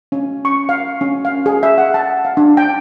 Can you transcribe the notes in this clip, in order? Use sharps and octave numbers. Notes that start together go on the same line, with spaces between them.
C#4
C#6
F5
C#4
F5
G#4
E5
F#5
A5
F5
D4
G5